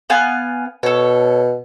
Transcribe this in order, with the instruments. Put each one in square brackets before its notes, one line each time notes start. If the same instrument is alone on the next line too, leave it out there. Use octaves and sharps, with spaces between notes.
[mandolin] B3 F5 G#5
[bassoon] B2 [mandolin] A4 C#5